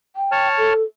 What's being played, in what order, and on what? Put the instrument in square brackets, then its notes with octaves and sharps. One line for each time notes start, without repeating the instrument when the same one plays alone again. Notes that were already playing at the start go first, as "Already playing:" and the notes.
[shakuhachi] G5
[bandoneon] C#5 A5 F6
[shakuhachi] A4